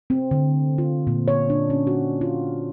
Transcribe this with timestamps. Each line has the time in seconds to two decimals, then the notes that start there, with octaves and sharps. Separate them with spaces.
0.10 C4
0.31 D3
0.78 F4
1.07 A#2
1.28 C#5
1.50 D4
1.70 C#4
1.87 F#4
2.21 F4